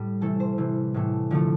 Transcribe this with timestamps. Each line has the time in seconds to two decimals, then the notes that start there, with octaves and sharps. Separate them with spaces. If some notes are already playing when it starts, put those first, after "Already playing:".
Already playing: A2 G3
0.21 C3 E3 A3 A4
0.40 C5
0.58 C3 E3 G3
0.94 A2 E3 A3
1.31 D3 F3 A3